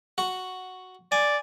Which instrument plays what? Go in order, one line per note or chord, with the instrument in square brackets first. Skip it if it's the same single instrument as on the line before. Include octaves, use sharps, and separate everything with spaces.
[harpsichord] F#4
[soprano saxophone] D5 [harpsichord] G#5